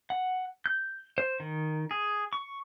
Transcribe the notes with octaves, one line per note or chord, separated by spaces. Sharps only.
F#5
G6
C5
D#3
G#4
C#6